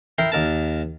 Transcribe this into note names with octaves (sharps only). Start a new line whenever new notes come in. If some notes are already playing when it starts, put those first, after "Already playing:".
E4 A#4 G5 C6
D#2 A#4 A5